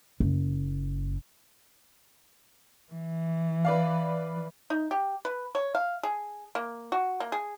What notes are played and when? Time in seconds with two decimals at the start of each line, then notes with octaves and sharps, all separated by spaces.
0.20 F#1
2.92 E3
3.65 B4 D5 F5
4.70 D#4
4.91 G4
5.25 B4
5.55 C#5
5.75 F5
6.03 G#4
6.55 A#3
6.92 F#4
7.20 A#3
7.32 G#4